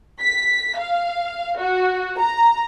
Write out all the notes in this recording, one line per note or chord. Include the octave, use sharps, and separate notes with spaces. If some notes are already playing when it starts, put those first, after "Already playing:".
B6
F5
F#4
A#5